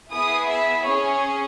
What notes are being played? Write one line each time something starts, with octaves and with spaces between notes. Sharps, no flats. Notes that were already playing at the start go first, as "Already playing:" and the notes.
B3 E4 G#4 D#6
E5
C#4 G#4 C#5